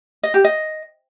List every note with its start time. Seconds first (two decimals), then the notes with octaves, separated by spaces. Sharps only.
0.23 D#5
0.34 G4
0.44 D#5